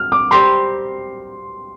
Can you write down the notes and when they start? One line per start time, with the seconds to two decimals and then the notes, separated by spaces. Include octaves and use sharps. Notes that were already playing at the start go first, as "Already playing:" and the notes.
Already playing: F6
0.12 D6
0.31 G3 C4 G4 A#4 C6